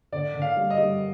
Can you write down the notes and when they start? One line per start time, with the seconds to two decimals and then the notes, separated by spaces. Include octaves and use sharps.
0.12 D3 D5
0.34 D3
0.42 F5
0.57 G3
0.70 D#5
0.78 G3